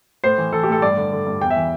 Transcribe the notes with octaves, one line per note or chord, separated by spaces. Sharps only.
A2 C5
E3
E3 A4
G4
A2 A4
G2 D5
D3
D3
G2
E2 G5
E5
E3